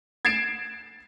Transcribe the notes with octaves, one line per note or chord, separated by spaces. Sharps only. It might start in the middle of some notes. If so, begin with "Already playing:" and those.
G#6 A6 C7 D7 E7